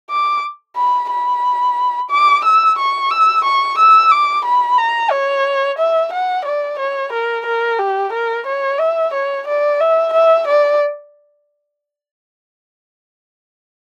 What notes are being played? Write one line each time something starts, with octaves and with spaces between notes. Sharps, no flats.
D6
B5
B5
D6
E6
C#6
E6
C#6
E6
D6
B5
A#5
C#5
E5
F#5
D5
C#5
A#4
A#4
G4
A#4
C#5
E5
C#5
D5
E5
E5
D5